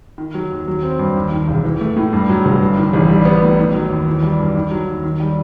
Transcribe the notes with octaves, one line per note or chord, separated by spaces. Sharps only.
D#3
F#3
D#2
F#3
C4
G2
D#2
D#3
E1
E3
A3
A2
G2
F#3
G1
G2
D#3
A1
G3
B3
A2
D#3
F#3
D#2
E3
G3
G2
D#3
F#3
D#2
D#3
G3